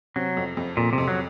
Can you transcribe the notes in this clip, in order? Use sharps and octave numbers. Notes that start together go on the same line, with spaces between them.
C3 F#3
F2
F2
F2 A#2
C3
F2
F#3